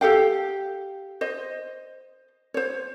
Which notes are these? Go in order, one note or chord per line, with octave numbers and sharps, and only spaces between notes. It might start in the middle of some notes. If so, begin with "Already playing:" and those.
G4 A4 F5 G5
C5 D#5
C5 C#5